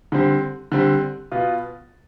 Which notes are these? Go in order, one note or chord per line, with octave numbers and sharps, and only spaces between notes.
D3 G3 C4
D3 G3 C4
B2 B3 F4